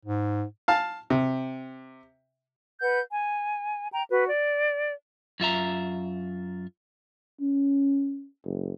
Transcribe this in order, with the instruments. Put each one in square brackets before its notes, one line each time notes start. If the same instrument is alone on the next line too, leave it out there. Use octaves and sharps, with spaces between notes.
[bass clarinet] G#2
[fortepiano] F5 A5
C3
[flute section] B4 F#5 G6
G#5
G5 A#5
F#4 B4
D5
[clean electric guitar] F#2 F4 E5 A#5
[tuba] C#4
F#1